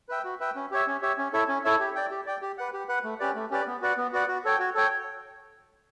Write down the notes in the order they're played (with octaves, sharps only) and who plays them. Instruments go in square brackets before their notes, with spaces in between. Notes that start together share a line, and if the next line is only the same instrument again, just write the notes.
[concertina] B4 E5 G5
F#4
B4 E5 G5
C#4
G4 C#5 E5
C#4
G4 C#5 E5
C#4
E4 A4 C#5 E5
C#4
E4 A4 C#5 E5
G4
D5 G5
G4
D5 G5
G4
B4 F#5
G4
B4 F#5
A3
C#4 G4 B4 D5
A3
C#4 G4 B4 D5
B3
F#4 B4 D5 F#5
B3
F#4 B4 D5 F#5
F#4
A4 C#5 G5
F#4
A4 C#5 G5